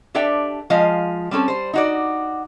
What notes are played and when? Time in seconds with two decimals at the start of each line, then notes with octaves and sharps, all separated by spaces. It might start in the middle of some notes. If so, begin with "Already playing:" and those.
0.15 D4 G4 A4 D5 E5 G5
0.70 F3 G#3 D#5 F5
1.31 G3 C4 C#4 A4
1.48 G3 C5
1.73 D#4 F#4 D5